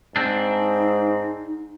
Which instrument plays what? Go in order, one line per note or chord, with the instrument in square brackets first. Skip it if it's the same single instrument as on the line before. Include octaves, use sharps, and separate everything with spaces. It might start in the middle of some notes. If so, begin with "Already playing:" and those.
[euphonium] G#2 [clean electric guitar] C4 D4 [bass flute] D#4